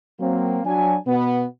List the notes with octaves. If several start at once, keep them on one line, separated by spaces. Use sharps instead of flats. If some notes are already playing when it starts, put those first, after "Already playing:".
F#3 A#3 C4
F#3 D4 G#5
B2 B3